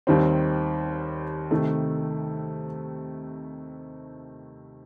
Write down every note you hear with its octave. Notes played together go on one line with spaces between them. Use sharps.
D#2 D#3 G3 C4
C3 D#3 A3